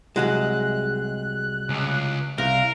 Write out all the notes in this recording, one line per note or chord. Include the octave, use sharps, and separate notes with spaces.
C2 F#3 G#3 F#6
C#2
C2 A#4 F5